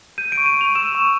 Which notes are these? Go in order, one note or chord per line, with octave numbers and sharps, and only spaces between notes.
G6 D#7
D7
C#6
D#7
C#6 F7
E6 E7
C#6